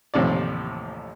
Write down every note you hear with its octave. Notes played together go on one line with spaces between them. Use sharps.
A1 D#2 A2 C3 F3 D5